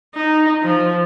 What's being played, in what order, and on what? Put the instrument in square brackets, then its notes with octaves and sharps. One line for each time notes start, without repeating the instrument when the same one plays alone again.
[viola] D#4
F3